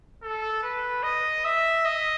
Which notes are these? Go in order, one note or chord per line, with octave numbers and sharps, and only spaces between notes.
A4
B4
D#5
E5
D#5